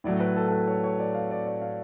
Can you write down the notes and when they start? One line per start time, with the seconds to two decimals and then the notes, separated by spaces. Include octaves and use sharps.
0.04 A2 F#3 A3 D5
0.20 B4
0.36 A4
0.48 A4
0.52 B4
0.68 C#5
0.84 C#5
0.99 D5
1.15 F5
1.31 D5
1.47 D5
1.62 F5